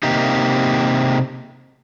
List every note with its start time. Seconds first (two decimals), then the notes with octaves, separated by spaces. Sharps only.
0.03 C3 A#3 D#4 G4